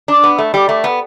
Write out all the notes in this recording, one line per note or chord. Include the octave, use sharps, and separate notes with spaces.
D4
B3
A3
G3
A3
B3